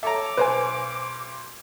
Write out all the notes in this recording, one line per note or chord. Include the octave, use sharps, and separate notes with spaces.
A4 C#5 E5 A#5 D6
B1 B4 C5 G#5